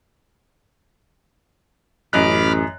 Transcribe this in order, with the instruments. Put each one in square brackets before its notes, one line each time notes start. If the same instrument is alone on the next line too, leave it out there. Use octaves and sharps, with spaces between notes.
[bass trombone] A1 [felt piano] F#2 D#5 F#6 [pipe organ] B5 D6 F6